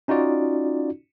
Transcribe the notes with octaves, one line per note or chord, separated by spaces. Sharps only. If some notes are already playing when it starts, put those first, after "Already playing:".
C#4 D#4 F4 F#4 D5